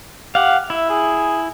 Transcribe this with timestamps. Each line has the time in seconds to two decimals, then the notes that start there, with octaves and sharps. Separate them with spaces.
0.35 G4 F5 F#5
0.70 E4 E5
0.90 G#4